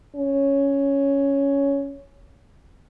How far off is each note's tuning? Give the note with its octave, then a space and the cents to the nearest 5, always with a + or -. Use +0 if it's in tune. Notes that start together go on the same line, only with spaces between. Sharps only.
C#4 +5